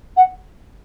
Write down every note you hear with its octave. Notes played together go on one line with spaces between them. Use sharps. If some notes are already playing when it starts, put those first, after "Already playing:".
F#5